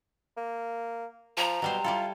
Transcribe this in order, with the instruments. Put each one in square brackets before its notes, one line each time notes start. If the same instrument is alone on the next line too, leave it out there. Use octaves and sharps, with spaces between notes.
[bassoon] A#3
[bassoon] F3 [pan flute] A#5
[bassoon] B2 [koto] F#3 G3 C5
[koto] G3 E4 A4 [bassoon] F4